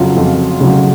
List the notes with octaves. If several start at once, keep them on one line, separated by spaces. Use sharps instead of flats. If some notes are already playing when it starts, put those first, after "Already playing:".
Already playing: F2 C#3 F#3 F4
F2
C#3 F#3